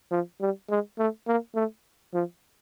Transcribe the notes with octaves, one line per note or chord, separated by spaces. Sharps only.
F3
G3
G#3
A3
A#3
A3
F3